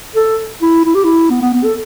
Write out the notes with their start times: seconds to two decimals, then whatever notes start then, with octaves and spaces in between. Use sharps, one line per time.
0.16 A4
0.62 E4
0.85 E4
0.95 G4
1.04 E4
1.30 B3
1.42 B3
1.53 B3
1.64 A4